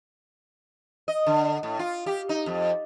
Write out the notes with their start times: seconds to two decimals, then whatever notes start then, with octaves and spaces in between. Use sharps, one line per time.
1.08 D#5
1.26 D3
1.63 A2
1.79 F4
2.06 G4
2.29 D#4
2.46 F2